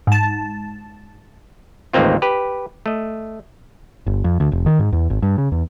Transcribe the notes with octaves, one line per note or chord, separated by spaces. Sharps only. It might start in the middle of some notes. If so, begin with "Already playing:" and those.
G#2 A5
A1 D#2 G#3 A#3 C4 F4
G4 B4
A3 D#5
G1
F2
D2
F1
D#3
G#2
E2
G#1
G2
C#3
E2